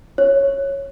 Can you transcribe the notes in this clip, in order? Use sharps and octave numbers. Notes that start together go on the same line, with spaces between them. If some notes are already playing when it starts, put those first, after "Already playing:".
C#5